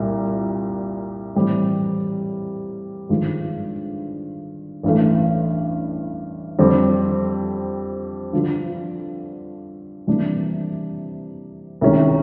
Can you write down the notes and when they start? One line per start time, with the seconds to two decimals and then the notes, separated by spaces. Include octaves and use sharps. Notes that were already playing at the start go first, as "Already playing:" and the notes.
Already playing: C2 A#2 G3
1.35 A2 E3 G3 C4
3.09 G#1 G2 D3 F3 G#3
4.83 A1 G2 E3 A3
6.59 F2 D3 G3 C4
8.33 G2 D3 F3
10.07 C3 E3 G3 A#3 D4
11.81 C2 C3 D#3 G#3 C#4